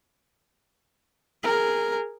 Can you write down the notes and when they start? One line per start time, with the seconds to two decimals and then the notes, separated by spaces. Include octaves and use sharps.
1.43 G#4 A#4